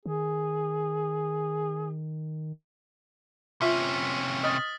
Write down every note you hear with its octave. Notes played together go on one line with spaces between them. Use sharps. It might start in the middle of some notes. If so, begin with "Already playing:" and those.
D#3 G#4
C3 C#4 F4 E5 B6
D#5 D#6 F6 A6